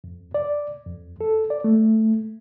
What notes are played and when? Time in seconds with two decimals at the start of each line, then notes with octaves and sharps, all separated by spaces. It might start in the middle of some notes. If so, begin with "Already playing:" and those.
0.04 F2
0.34 D5
0.87 F2
1.21 A4
1.50 D5
1.64 A3